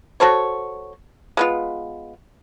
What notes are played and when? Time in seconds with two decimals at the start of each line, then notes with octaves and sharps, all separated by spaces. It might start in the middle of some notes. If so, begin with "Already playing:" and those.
0.20 F#4 A4 C5 C#5
1.37 G#3 B3 F4